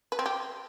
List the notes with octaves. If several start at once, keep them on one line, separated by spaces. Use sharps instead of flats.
B4
C4
G4